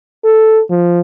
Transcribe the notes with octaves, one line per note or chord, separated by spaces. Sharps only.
A4
F3